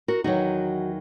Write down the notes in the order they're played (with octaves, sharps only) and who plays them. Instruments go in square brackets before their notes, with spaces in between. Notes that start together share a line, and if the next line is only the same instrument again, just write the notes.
[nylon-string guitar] F#4 A#4
E2 D#3 F#3 D#4 F#4